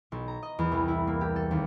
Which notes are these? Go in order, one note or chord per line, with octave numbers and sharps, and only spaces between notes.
B1
A#5
D#5
E2
C2
E4
A#3
G4
A4
D#2